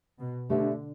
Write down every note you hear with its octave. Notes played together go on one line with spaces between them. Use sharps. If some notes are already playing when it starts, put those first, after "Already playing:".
B2
B2 D3 A3 G4 E5